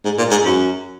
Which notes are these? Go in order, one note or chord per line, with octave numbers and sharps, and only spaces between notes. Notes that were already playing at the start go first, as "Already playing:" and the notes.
G#2
A#2
G#2
F#2